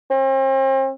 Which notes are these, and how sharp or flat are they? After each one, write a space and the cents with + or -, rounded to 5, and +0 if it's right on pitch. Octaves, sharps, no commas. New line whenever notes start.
C4 +40